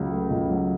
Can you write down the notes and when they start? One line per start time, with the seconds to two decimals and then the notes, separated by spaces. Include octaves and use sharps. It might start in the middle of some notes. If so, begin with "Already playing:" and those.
Already playing: C#2 C#3 F#3
0.11 A3
0.30 C#2
0.50 F#3